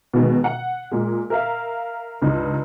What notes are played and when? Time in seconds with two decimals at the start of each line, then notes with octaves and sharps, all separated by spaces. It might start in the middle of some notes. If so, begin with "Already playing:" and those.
0.14 B2 D#3 G#3
0.44 F#5
0.92 A#2 G#3
1.30 A#4 E5 F5
2.22 C#2 G2 D#4